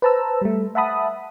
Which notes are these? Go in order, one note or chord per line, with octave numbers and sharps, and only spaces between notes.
B4 C5 A5 A#5 E6
G3 A3
E5 F#5 A5 B5 D#6